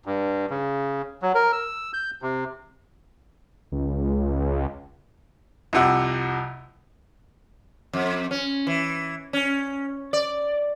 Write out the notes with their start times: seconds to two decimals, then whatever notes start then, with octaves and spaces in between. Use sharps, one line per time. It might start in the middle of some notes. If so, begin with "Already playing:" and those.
0.06 G2
0.50 C#3
1.22 F#3
1.35 A#4
1.53 E6
1.93 G6
2.22 C3
3.72 C#2
5.73 C2 F2 C3 F#5
7.93 F2
8.31 C#4
8.67 E3
9.33 C#4
10.13 D5